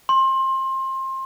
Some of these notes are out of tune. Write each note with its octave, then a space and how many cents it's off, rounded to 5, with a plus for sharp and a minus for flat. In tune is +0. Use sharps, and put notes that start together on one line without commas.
C6 +25